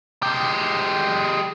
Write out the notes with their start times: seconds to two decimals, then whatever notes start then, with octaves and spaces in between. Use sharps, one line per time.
0.23 G#3 G4